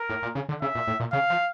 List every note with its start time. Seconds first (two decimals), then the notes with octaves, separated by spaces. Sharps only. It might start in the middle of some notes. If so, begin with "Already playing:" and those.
Already playing: A#4
0.09 A2
0.23 A#2
0.35 C#3
0.49 D3
0.62 C#3 E5
0.75 A#2
0.87 A2
1.00 A#2
1.12 C#3 F5
1.30 F3